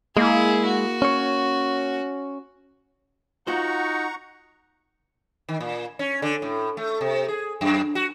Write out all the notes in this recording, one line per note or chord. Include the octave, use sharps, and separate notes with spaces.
G#3 A#3 E4 G#4
F#4
C#4 C#5
D#4 F4 F#4 C5 F#5 A#5 C#6
D#3
A#2
C#4
D3
A2
A3
C3
G#4
F#2
F#4